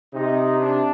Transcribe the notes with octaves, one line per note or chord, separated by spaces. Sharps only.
C3 D#4
D4